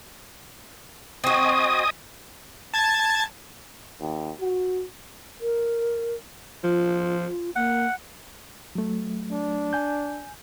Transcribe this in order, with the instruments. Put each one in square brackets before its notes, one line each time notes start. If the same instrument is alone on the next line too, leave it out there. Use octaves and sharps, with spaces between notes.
[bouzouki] C4 F#4 [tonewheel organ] D#5 G#5 D#6
[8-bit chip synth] A5 G#6 A6
[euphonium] D#2
F#4
[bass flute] A#4
[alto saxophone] F3 [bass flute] F4
[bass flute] A#3 [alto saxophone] F#5
[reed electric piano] F#3 A3
[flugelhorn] D4
[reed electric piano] G#5 G6